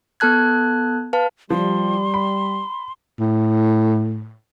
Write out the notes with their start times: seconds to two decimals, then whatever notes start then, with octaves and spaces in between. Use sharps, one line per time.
0.20 B3 A4 A5 F#6 G#6
1.13 B4 F5 A5
1.50 F3 G3 C6
2.14 B5
3.19 A2